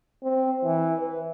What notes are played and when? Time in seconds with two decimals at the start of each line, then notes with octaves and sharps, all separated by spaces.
0.23 C4
0.64 E3
1.01 B4